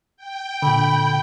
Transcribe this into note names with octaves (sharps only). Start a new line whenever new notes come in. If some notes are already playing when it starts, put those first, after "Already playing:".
G5
A#2 D3 B5